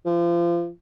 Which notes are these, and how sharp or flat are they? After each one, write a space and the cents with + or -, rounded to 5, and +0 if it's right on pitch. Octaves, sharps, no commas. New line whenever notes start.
F3 -30